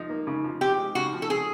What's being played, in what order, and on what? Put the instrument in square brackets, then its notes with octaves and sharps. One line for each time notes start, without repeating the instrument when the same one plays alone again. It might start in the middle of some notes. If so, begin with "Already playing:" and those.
Already playing: [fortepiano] F3 D#4
A#3
C#3
F3
[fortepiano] C4 [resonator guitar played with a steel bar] G4
[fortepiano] G#3
[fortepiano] C#3 [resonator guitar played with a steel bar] F#4
[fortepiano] F3
[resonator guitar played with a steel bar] A4
[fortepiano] C4 [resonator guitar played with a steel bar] G#4